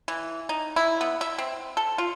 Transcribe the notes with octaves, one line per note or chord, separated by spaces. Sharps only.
E3
D#4
E4
B3
E5
C4
A4
F4